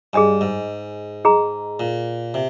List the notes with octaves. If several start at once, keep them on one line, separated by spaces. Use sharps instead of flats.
G2 G#4 D#5 G#5
G#2
G#4 D#5 A#5
A#2
C3